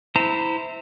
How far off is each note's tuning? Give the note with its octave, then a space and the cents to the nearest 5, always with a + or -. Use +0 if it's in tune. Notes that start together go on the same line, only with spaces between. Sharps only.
E4 -10 C5 -20 A#5 -30